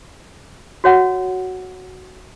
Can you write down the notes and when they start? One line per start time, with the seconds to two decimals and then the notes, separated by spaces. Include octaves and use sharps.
0.84 F#4 C#5 F#5